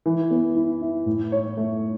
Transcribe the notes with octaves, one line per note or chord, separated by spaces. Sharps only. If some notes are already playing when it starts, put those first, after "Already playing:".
E3
B3
E4
E4
A2
C#5
A3